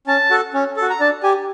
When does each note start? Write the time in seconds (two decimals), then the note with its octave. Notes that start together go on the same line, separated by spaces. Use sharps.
0.07 C#4 A5
0.30 F#4 A4
0.54 C#4
0.77 A4
0.82 F#4
0.90 A#5
1.00 D4 A5
1.23 G4 G#5